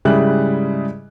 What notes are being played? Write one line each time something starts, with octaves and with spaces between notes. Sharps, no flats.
G#2 C#3 G3 E4 G#4 F#6